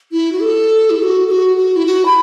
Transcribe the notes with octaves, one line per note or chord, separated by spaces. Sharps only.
E4
F#4
A4
E4
A4
F#4
A4
F#4
F#4
E4
F#4
B5